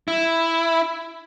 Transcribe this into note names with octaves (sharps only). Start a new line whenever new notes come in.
E4